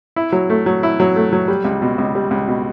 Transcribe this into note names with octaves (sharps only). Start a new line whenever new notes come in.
E4
F#3
A3
F#3
E4
F#3
A3
F#3
G3
C#2
B2
C#2
G3
C#2
B2